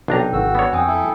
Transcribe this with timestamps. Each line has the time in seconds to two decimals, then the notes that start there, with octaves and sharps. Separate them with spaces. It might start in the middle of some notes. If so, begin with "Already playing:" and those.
0.08 B1 C3 D4 A#4 G5 A#5
0.33 G#1 F#4 E6
0.55 B3 D4 C#5
0.73 F2 G5 G#5 D#6
0.87 E4 A4